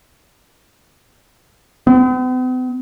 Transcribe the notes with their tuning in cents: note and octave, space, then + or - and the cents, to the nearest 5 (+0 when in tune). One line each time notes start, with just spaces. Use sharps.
B3 +45